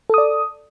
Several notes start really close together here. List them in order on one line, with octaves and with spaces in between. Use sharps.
A4 D#6 D5